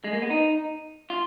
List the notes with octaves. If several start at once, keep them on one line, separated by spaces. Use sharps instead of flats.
G#3
A#3
B3
D#4
F4